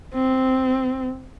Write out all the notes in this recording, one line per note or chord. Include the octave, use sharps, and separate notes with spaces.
C4